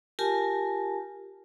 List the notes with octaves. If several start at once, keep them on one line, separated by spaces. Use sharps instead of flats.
F4 G4 A#4 G#5 A5